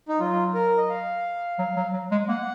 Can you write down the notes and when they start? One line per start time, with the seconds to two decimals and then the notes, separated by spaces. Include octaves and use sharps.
0.09 D#4
0.19 F#3 F4
0.54 A#4
0.78 D#5
0.89 F5
1.59 F#3
1.77 F#3
1.93 F#3
2.12 G#3
2.29 A#3 F#5